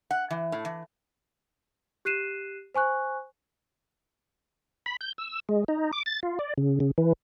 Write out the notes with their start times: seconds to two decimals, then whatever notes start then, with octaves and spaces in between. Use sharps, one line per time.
0.11 F#5
0.31 E3
0.52 A2
0.65 E3
2.05 G4 F#6 C7 D#7 E7
2.75 C5 G#5 C#6 F#6
4.86 B5
5.01 G6
5.18 E6
5.49 G#3
5.68 D#4
5.93 D6
6.06 A6
6.23 F4
6.39 D5
6.58 C#3
6.80 C#3
6.98 E3